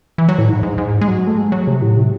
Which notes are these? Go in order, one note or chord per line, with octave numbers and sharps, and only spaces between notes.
E3
F#3
A2
G#2
G#2
G#2
G#3
F#3
A3
G#3
F#3
C3
A2
C3